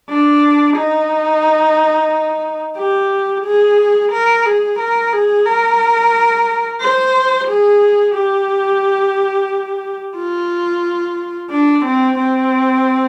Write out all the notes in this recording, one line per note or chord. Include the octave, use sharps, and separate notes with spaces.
D4
D#4
G4
G#4
A#4
G#4
A#4
G#4
A#4
C5
G#4
G4
F4
D4
C4
C4